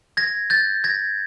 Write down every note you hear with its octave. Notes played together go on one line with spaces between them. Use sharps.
G#6 A#6
G6 A6
G#6 A#6